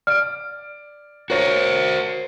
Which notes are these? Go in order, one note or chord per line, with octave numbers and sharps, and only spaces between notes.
D5 F6 D7
F#4 A#4 C5 C#5 A#6